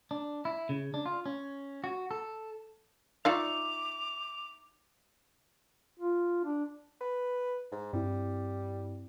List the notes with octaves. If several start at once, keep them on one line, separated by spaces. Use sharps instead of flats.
D4
E4
C#3
D4
F4
C#4
F#4
A4
D#4 F4 D5 E5 F5 C#6 D6 F7
F4
D4
B4
G#2
G2 G3 C4 E4